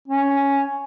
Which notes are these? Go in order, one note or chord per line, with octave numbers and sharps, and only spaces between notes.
C#4